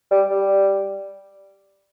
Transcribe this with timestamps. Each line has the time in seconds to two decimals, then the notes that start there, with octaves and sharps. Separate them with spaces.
0.11 G3
0.30 G3